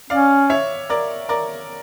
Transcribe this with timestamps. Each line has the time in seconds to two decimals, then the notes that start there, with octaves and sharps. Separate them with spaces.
0.10 C#4 D5 F5
0.50 C#5 E5
0.90 A#4 D5
1.29 A#4 D5